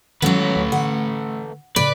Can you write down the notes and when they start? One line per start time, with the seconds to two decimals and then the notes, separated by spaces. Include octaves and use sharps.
0.22 D#3 F#3 G#3 A3 B3 C#4 B4
0.56 D2
0.72 D3 F#5
1.76 A2 C#3 B4 D5